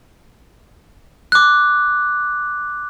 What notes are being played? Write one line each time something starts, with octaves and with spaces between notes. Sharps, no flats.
D6 F#6